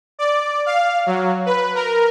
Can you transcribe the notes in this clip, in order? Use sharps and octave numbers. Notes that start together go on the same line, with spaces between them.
D5
F5
F#3
B4
A#4